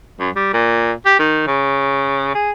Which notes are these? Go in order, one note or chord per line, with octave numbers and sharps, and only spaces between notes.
F#2
G3
A#2
G4
D#3
C#3
G#4